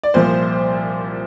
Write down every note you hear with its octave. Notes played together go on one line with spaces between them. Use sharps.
D5
C2 A#2 F3 C5